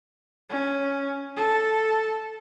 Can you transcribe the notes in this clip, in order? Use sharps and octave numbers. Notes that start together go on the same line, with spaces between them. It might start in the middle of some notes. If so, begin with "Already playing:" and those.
C#4
A4